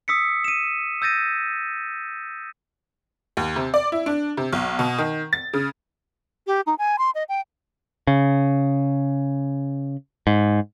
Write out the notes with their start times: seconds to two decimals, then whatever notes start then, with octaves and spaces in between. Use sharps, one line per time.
0.08 D#6 E6 B6 C#7
0.44 D#7 E7
1.02 E6 G6 A6 A#6 D#7
3.37 D#2
3.56 C3
3.74 D5
3.92 E4
4.06 D4
4.37 C3
4.53 B1
4.79 B2
4.98 D#3
5.33 A6
5.53 C#3
6.47 G4
6.66 D#4
6.79 G#5
6.98 C6
7.15 D#5
7.29 G5
8.07 C#3
10.27 G#2